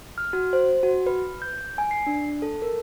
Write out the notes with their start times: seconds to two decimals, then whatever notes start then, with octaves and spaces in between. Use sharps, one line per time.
0.18 F6
0.33 F#4
0.53 C5
0.83 F#4
1.07 B4
1.42 G6
1.78 G#5
1.91 C7
2.07 D4
2.42 A4
2.62 A#4